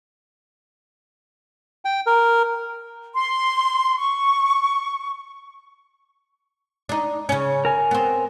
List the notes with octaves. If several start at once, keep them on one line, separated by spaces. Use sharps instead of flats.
G5
A#4
C6
C#6
D4 D#4
C#3 C#4
A#4 G#5
B3 C4